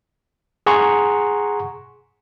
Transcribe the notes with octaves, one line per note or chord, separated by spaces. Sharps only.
G#4 F#5 G#5 A#5 C6 C#6